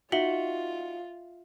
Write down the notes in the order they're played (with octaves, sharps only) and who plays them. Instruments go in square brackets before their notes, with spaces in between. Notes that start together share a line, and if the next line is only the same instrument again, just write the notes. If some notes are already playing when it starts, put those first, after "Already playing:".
[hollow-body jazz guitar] D#4 F#4 [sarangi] F4 [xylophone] E5 F#7 G7